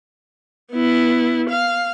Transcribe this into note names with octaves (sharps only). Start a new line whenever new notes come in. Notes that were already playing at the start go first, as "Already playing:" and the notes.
B3 E4
F5